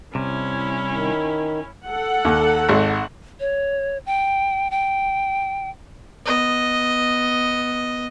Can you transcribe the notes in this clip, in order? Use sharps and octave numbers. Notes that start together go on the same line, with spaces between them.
C2 C3 C#4 E4
D#3
A4 F#5
D#2
G#1
C#5
G5
G5
B3 D#5